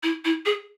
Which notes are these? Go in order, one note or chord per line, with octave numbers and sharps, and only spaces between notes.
E4
E4
G#4